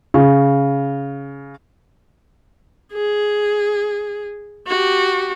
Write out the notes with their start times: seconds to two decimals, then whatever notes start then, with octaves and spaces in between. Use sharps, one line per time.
0.14 C#3
2.93 G#4
4.67 F#4 G4